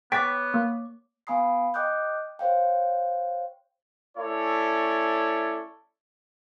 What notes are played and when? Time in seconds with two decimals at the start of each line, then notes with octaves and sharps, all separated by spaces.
0.12 B3 C#5 G5 D6 A6 B6
0.54 A#3
1.27 B3 F5 G#5 B5 D#6 C7
1.74 D#5 G5 D6 D#6 F#6 G6
2.39 C5 C#5 F5 G5
4.17 A3 C#4 E4 A4 C#5 D5